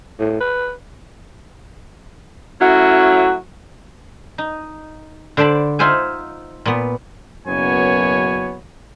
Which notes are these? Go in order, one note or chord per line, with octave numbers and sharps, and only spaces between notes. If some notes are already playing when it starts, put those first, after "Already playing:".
A2
B4
F#3 A3 C#4 E4 F#4
D#4
D3 C5 D5 A5 B5
D#4 F4 C5 E5 F#5 G#5
A#2 B3
F#1 F#2 B2 B3 C#5 G#5